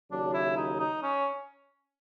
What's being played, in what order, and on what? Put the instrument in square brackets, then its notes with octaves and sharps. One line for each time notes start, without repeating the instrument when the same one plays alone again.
[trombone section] D#2 C#3 F#3 [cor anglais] D4
[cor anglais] E4
D#4
D#4
C#4